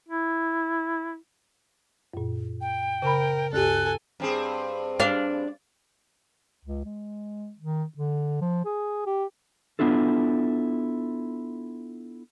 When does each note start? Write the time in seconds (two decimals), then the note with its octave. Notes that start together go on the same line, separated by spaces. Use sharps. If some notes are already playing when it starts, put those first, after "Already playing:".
0.09 E4
2.14 F#2 A#2
2.61 G5
3.02 C#3 A#4 B5
3.53 D2 G2 G4 A4 G#5 F#6
4.20 G2 C4 G#4
5.00 D4 F5
6.65 C#2
6.85 G#3
7.59 D#3
7.98 D3
8.41 F3
8.65 G#4
9.06 G4
9.79 B3 D4 E4 F4 A4